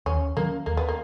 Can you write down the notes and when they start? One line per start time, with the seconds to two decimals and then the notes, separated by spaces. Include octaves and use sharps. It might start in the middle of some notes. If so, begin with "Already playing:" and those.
0.06 D#2 C#4
0.37 D#3 F#3 A#3 C#4
0.66 D#2 A#3
0.77 B3
0.88 A#3